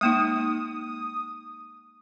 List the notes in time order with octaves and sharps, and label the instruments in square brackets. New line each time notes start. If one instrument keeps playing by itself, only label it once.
[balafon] G#3 A#3 D#4 [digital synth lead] D#6